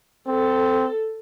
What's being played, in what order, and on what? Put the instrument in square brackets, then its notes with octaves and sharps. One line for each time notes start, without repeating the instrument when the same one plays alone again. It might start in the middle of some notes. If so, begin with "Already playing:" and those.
[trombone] C4 [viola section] A4